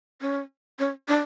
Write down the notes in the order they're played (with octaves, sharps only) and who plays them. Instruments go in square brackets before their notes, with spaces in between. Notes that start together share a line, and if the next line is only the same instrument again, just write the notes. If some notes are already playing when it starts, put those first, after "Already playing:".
[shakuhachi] C#4
C#4
D4